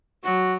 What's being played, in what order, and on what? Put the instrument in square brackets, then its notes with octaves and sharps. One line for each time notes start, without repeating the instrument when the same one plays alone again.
[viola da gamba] F#3 [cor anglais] F#4